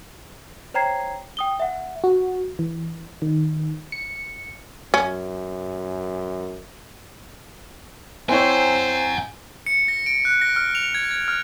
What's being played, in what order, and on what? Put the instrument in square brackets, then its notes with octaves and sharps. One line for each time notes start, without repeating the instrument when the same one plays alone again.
[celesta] C5 C#5 G5 A#5 G#6 C7
G5 D#6 G7
E5 F#5
[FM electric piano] F#4
E3
D#3
C#7
[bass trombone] F#2 [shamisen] C#4
[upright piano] C4 E4 C#5 [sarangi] C5 [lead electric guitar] F#5 G#5
[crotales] C#7
A#6
D7
F#6
A#6
F6
F7
G#6
G#6
F6